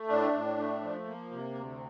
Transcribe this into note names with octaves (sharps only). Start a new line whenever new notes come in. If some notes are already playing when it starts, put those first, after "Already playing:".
Already playing: A3
A2 D4
A2
A3
F3
A#3
C3
D2